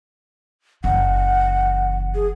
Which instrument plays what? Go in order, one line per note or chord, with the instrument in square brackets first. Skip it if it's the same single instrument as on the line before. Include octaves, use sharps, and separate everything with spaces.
[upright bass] F#1 E3 [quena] F#5
[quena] G#4